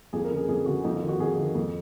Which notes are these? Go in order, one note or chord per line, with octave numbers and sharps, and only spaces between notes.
F2 G#4
A#4
C#3
G#4
F2 G#4
C#3 F#4
F2 D#4
F4
D#3
F#4
F2 G#4
D#3
F2